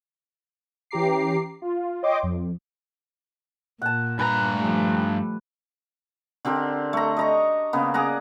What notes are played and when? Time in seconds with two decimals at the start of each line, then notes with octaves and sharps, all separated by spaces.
0.91 E3 C#4 G4 A#5 D6 C7
1.62 F4
2.03 C#5 D#5 G5 C6 D6
2.23 F2
3.82 A#2 F#5 A5
4.19 G2 B4 G#5 A#5
4.53 F3 G3 A3
6.45 D3 C4 G4 A#4
6.93 A3 A#5
7.17 D#5 A#5 C#6
7.73 C#3 A#3 B3
7.94 G#4 D5 F#5 A#5